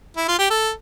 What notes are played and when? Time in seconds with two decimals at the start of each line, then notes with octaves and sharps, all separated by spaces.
0.17 E4
0.28 F4
0.39 G4
0.50 A4